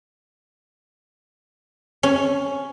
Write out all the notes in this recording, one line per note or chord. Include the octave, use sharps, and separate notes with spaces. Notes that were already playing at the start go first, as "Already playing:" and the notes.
C#4